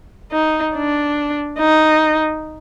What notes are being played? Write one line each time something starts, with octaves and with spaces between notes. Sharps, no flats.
D#4
D4
D#4